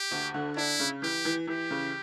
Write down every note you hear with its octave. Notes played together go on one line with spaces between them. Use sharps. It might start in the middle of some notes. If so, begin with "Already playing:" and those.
Already playing: G4
D2
D3
D4 E4
C#3
E3 G4
E3
E3 G4
C#3